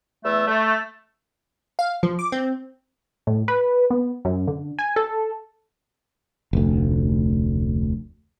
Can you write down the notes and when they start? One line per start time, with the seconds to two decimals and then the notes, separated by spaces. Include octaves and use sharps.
0.24 E2 A3 E6
0.47 A3
1.79 F5
2.03 F3
2.19 D6
2.32 C4
3.27 A2
3.48 B4
3.91 B3
4.25 F#2
4.48 D3
4.79 G#5
4.96 A4
6.53 F1 D2